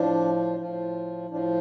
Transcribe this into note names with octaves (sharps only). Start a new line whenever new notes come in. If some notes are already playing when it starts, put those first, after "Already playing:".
Already playing: A2 F3 D4
A2 F3
A2 F3 D4